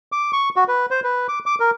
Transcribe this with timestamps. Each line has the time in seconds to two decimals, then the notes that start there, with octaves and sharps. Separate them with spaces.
0.12 D6
0.33 C#6
0.56 F#4
0.68 B4
0.91 C5
1.04 B4
1.28 D6
1.46 D6
1.60 A#4